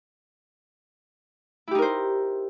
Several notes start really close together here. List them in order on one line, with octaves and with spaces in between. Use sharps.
E4 G4 D#4 A#4 C5